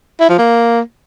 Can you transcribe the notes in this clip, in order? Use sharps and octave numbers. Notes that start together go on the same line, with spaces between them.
E4
F3
A#3